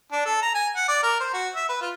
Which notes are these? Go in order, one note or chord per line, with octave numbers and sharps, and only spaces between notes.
D4
A4
A#5
G#5
F#5
D5
A#4
C5
F#4
E5
B4
F4